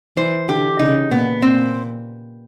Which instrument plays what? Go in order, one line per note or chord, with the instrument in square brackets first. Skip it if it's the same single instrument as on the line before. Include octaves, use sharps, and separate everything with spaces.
[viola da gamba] E3 [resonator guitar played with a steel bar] C5
[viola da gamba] D3 [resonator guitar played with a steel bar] G4
[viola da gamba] C#3 [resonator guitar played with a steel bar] D#4
[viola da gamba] A#2 [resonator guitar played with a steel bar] B3
[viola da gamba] A#2 [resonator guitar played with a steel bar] C4